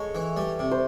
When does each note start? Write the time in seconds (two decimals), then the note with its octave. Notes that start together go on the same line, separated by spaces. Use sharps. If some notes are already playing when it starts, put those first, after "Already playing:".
Already playing: G#3 A4 C#5
0.15 E3
0.37 G3
0.59 C3
0.71 C5